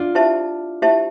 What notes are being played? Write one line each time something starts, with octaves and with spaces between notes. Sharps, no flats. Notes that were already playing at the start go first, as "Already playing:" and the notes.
Already playing: D4 F4
E4 G4 C5 E5 A5
E4 G4 C5 E5 A5